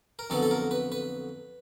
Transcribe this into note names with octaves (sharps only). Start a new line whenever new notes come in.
A#4
F2 D3 F#3 B3 A4
A4
A#4
B4
B4